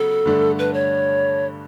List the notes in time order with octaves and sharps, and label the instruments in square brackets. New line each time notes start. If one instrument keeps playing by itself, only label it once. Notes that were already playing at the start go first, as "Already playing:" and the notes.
Already playing: [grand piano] C#3 F#3 B3 [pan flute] A4
[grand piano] G2 D3 A3 D4
[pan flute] B4
C#5